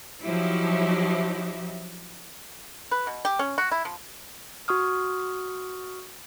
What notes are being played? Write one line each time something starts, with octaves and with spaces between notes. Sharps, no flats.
F3 F#3 D#4 E4 G4
B4
B2
G4
C#4
F#4
E4
F3
F#4 C#6 D#6 F6